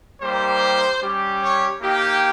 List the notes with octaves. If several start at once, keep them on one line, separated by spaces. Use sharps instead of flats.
G3 A#3 D#4 G4 C5
G3 C#4 G4
C#5
A#3 D#4 G4